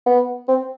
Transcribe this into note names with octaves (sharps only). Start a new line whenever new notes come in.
B3
C4